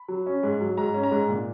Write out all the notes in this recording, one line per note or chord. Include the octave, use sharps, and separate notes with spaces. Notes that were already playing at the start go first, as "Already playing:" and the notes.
Already playing: B5
F#3
C#4
G#2
F#3
G#2 A#5
C#4
A#5
G#2
A#2